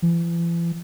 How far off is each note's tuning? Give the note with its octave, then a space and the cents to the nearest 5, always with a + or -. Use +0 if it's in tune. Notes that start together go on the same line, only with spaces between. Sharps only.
E3 +45